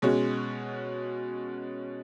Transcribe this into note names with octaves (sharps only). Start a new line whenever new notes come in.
B2 G#3 C#4 F#4